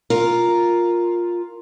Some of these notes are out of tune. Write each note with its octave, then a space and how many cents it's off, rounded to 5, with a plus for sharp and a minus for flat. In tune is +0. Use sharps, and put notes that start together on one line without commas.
F4 +5 A#4 +0